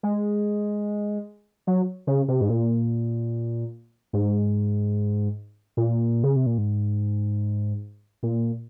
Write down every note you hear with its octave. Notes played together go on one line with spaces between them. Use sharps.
G#3
F#3
C#3
C3
G#2
A#2
G#2
A#2
C#3
C3
A#2
G#2
A#2